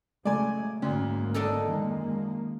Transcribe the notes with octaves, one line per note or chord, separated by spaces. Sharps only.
C#3 F#3 G#3 A3 D5 G#5
F#1 D2 G#2 A#3 C#4
D4 D#4 A4
F#2 D#3 G#3 A#3